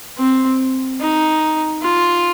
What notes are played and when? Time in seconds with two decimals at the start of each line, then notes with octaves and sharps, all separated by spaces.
0.18 C4
1.01 D#4
1.82 F4